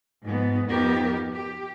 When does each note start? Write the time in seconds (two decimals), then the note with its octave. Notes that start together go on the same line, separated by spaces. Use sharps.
0.23 G#2 F3 B3
0.68 F2 B3 D#4 G4 A#4
1.34 G4